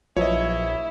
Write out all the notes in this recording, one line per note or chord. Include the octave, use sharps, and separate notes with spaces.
A#1 F3 F#3 E4 B4 C#5 D#5